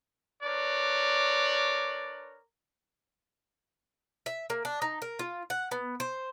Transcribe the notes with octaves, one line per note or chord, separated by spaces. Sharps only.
D4 A#4 B4 C#5 D5
E5
A#3
D4
D#4
A#4
F4
F#5
B3
C5